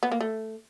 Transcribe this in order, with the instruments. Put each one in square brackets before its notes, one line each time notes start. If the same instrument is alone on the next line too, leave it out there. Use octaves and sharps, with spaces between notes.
[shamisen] B3
A#3
A3